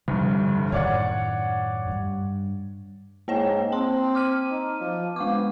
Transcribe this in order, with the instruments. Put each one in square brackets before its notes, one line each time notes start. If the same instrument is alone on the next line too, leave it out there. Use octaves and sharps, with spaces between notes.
[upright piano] F1 D2 G2 [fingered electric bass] G3
[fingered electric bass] F#2 A2 D#3 [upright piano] C#5 D5 F#5
[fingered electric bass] G2
[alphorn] G#2 [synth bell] A#3 C#5 G5
[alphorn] C4 [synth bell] A5 C6
[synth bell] D6 F6 D#7
[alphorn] D#4
F3
[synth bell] G#3 C#6 D6 [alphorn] B3